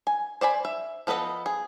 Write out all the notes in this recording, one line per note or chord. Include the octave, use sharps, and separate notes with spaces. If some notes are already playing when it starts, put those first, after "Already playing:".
G#5
C5 D5 G#5 B5
E5
F3 B3 A4 B4 D#5
G#4